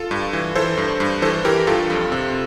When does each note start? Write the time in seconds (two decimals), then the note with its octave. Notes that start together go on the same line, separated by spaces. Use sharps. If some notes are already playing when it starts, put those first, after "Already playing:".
Already playing: F4 A4
0.11 G2
0.33 E3
0.55 E3 A4 C5
0.77 G2
1.00 G2
1.22 E3 A4 C5
1.44 E3 G4 A#4
1.67 G2 F4 A4
1.90 F2
2.12 C3